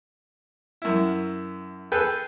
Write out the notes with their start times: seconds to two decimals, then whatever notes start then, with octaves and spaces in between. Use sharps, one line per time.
0.82 F#2 E4
1.92 G#4 A4 B4 G5